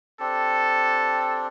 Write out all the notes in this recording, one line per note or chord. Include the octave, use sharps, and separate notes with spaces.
C4 D4 G4 A4